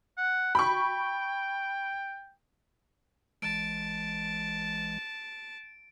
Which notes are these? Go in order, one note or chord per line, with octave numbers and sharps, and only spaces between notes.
F#5
G5 B5 C#6
A1 E3 G#3 A5 D7